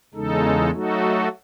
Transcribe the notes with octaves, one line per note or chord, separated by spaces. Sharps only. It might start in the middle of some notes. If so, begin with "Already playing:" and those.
E2 C#3 G#3 D#4 A4
F#3 A3 D#4 F#4 A4